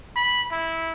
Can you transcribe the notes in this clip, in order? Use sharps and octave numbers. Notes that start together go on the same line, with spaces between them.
B5
E4